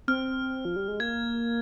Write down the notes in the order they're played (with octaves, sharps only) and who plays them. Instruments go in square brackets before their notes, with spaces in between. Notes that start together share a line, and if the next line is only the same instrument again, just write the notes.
[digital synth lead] C4 [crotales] F6
[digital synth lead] F3
G3
G#3
[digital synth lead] A#3 [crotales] G#6